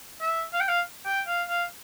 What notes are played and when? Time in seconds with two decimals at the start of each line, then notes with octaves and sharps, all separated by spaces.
0.21 E5
0.53 F5
0.60 G5
0.68 F5
1.06 G5
1.28 F5
1.48 F5